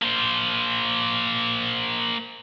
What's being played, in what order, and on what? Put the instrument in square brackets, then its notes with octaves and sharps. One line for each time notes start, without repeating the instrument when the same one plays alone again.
[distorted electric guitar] A#3 C5